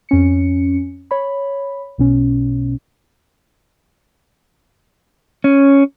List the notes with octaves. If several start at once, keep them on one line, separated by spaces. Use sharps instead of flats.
F2 C#4 C#7
C#5 B5
B1 B2 C#4
C#4